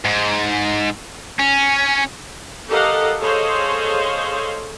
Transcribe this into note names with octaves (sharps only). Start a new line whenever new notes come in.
G#2
C#4
G4 A4 A#4 D#5 F5 F#5
G#4 A4 C5 C#5 D#5 F5